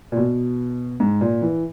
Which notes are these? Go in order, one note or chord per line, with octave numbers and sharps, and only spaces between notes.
A#2
B2
G#2
A#2
E3